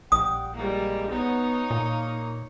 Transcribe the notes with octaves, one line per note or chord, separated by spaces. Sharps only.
A#1 G3 F#5 G5 D#6
E3 G3 G#3 A#3
B3 D#4 C#5
A#2 A#3